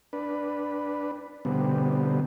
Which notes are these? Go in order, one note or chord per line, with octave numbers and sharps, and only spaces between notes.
D4 B4
B2 D3 G3 B3 C4